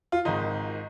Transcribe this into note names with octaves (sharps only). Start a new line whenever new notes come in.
F4
G#1 G#2 D#3 D#4